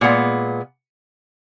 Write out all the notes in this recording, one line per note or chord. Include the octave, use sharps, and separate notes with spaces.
A#2 G#3 B3